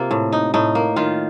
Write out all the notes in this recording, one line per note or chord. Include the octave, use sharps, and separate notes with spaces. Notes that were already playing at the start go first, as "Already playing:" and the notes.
Already playing: C3 A#3 F4
A2
D#4
A2 D#4
A#3
D#3 F4